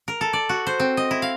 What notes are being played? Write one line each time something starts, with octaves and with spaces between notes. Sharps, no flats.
A#4
A4
D5
F#4
C5
C4
D#5
E4
F5